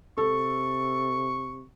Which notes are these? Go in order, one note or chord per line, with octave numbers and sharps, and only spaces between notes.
C3 A4 C#6